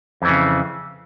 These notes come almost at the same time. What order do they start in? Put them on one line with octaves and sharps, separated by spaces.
F2 E3 C#3